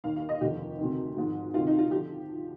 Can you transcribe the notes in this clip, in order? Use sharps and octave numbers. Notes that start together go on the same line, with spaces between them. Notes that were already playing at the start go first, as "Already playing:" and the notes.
D#2 D#3 F5
F5
D#5
F1 D#2 D3 F3 G4
D2 C3 D#3
G#1 G#2 F3
D2 C3 D#3 F4
D#4
F4
D3 F3 G4